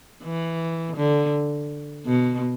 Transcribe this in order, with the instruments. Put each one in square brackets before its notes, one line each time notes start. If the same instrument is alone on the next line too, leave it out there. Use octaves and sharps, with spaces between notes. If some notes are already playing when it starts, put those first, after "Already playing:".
[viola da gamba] E3
D3
B2